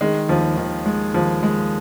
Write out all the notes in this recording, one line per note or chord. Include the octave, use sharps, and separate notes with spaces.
D#3 G#3
D#2 F3
D#3
G#3
D#2 F3
G#3